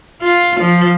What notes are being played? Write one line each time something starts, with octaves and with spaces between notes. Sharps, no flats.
F4
F3